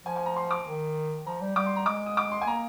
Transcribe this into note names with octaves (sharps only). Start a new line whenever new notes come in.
F3 G#5
G#5
A#5
C6
D6
D#3
F3 A#5
G3
G3 D6
C6
A#5
G#3 D6
D#6
D6
C6
G#5
A#3 A#5